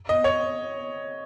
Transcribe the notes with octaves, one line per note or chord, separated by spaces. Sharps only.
D#5
C#5